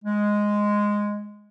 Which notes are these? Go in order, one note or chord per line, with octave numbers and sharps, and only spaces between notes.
G#3